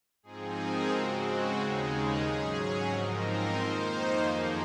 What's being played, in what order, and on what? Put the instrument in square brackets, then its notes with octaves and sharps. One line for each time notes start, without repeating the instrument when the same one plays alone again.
[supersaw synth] G#2 F3 C4 D#4 G#4
A#4
C#3 G#3 C4 F#4
D#2 C#3 G#3 D#4 G#4
G#4
G#2 F#3 C#4
G#2 F3 C4 D#4 A#4
C5
F2 D#3 A#3 D#4
F#2 F3 A#3 D#4 G#4